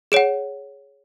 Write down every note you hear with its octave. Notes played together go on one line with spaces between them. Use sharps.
G#4 C#5 F#5 D7